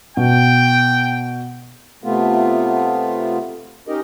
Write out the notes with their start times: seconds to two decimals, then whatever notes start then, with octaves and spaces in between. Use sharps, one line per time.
0.17 B2 G5
2.04 C3 A3 B3 F4
3.88 C#4 D#4 G4 A#4 D#5